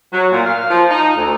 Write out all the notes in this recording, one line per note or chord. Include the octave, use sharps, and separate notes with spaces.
F#3
A#2
F5
F3
D#4
D2